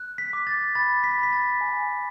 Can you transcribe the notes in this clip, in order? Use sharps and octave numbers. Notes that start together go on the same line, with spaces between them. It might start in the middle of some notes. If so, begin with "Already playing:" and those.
Already playing: F#6
B6
D6
A6
B5 A6
B6
B5
B6
A6
G#5